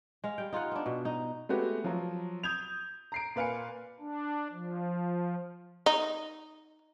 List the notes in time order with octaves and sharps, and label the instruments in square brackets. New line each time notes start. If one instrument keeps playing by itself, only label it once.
[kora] G#3 F5
G3 G5
D#4 F4 G#4 F#5
B3 D4
B2
D#4
[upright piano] G#3 A3 B3 F#4 G4 B4
F3 F#3
D#6 G6 G#6 F7
A#5 C7 D7
A#2 B4 F5 G#5 C#7
[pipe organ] D4
F3
[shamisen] D#4